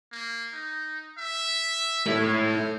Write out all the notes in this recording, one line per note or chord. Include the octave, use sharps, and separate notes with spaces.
A#3
D#4
E5
A3 E4
C4